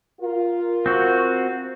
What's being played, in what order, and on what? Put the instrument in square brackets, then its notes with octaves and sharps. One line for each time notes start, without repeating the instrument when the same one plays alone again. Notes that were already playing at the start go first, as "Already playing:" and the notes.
[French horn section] F4 A#4
[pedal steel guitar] C4 F#4